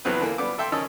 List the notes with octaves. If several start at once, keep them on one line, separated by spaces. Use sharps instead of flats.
E2 F#3 B3 C4 B4
D3 E3 A#3
G3 B3 D6
A4 E5 G5 C6
D#3 C#4 D#4 A5 E6